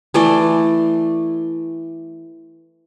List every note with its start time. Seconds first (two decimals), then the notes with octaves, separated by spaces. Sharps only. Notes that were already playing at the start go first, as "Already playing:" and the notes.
0.14 E3 A3 D5 C6